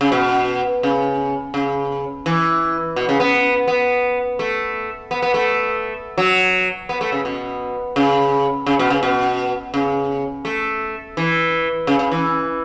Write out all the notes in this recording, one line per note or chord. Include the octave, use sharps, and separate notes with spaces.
C#3
B2
C#3
C#3
E3
B2
C#3
B3
B3
A3
B3
B3
A3
F#3
B3
A3
C#3
B2
C#3
C#3
B2
C#3
B2
C#3
A3
E3
C#3
C#3
E3